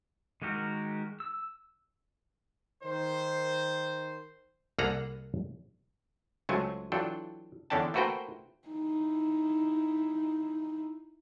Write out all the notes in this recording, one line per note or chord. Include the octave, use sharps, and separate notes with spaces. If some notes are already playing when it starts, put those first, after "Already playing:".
D#3 G#3 F#4 G4 A#4
E6
D#3 C5
C2 A#3 G#4 A4 F#5 A#5
C#2 F#3 A3 C5 G#5
E3 F#3 D4 F4 A4 G5
E2 D3 C#4 D4 G5 A5
A3 A#3 F#4 B4 C5 G5
D#4 E4